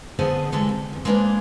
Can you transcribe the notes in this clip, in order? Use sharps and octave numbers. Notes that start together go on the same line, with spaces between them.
D3 B3 G#4 C5 D#5
D3 E3 G3 G#3 A4
C3
E2
G#3 A#3 D4 A4 B4 C5